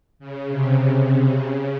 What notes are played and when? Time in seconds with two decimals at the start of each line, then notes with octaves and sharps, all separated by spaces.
0.19 C#3
0.50 C3
0.79 C3
1.40 C#3